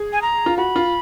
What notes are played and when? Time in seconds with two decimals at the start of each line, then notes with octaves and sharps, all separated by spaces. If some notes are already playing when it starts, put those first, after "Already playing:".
Already playing: G#4
0.13 G#5
0.22 A#5
0.46 F4
0.57 F#4 B5
0.76 F4